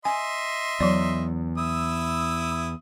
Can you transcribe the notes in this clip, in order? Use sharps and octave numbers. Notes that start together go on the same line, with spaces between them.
D#5 E5 G#5 C6
E2 F#3 D5
E4 D#6 E6